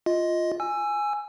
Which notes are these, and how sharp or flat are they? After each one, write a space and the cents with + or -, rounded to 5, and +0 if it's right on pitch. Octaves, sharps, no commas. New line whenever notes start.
F4 +0 D#5 +10
G#5 +0 E6 +20